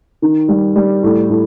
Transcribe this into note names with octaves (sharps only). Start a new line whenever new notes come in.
D#3
G3
G3
A2
A2